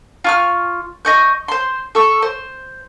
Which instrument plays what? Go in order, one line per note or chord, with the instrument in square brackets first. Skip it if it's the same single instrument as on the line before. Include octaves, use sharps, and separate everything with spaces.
[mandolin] F4 C#6 F6
D#5 C#6 G6
C5 C6
A4 C#6
C5